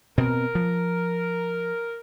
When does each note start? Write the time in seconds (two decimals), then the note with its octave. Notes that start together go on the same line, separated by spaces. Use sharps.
0.18 B2 C4 A#4
0.55 F3